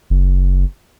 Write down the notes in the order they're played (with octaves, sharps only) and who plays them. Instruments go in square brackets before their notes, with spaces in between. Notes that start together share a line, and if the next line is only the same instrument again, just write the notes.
[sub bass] F#1